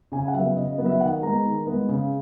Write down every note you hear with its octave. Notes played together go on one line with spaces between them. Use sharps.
C#3 G#5
F#5
F#3 E5
B3
C#3 D#5
D#5
F#3 B3
E5
D#3 F#5
G#3 B3 A#5
D#3
G#3 B3
C#3